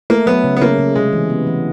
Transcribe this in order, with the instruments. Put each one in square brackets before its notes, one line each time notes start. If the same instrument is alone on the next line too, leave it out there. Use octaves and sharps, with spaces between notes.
[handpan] A3 [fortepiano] A#3
[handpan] F#3 [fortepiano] B3
[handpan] C#3
[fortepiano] B3
[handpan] C#3 [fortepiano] A#3
[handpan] C#3
[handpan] C3 [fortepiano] G#3
[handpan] E3
B3
E3